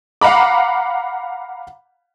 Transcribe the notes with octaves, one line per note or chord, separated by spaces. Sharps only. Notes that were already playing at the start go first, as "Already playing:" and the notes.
F5 F#5 A#5 B5 D6